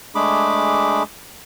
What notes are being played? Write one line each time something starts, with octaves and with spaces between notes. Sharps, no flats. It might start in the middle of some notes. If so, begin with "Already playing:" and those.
G#3 A3 D4 G#4 B5 D6